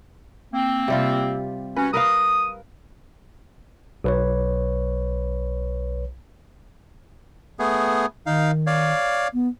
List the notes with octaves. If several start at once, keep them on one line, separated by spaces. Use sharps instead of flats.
A#3 C4
C3 G3 F4
C#4 F#4 B4
A#4 B4 F5 D#6
B1 B4 C#5
A3 B3 G#4
D#3 D#4 F5
C#5 D5 F5
B3